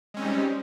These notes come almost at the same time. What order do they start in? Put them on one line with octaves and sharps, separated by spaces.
G#3 C#4 C4 D#4 G3